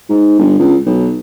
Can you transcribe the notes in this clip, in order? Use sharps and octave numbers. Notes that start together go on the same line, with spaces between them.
G#2
G1
C#2
B1